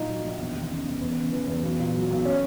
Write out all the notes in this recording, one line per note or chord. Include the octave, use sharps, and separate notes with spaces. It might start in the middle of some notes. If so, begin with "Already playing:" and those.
Already playing: A#1 A#2 D#4
F#3
A#1
E1
D#2
C#3
E1
E2
C#3
E3
E2
B1
A#2
F#3
B1
C#4